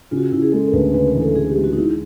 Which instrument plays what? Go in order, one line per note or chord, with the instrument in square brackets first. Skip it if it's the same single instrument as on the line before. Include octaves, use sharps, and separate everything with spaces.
[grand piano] C#3 [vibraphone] F4
[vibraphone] F#4
F4
[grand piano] C#3 [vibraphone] E4
[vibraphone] G#4
[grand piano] G#3 [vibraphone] A4
[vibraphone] A#4
[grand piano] D2 [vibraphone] B4
[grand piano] C#3 [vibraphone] B4
[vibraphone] A#4
[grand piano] E3
[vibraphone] A4
[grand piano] E3 [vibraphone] G#4
[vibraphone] G4
[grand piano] G#3
[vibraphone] F#4
D#4
[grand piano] G#3 [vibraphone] E4